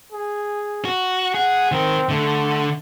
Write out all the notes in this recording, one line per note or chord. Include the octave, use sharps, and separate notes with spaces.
G#4
F#4
G#4 F#5
D#3 C4 A#4
D3 A3